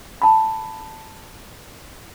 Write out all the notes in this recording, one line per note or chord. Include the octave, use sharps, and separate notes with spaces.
A5 B5